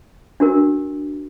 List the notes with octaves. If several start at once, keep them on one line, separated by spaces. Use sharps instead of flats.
D4 F#4 A#4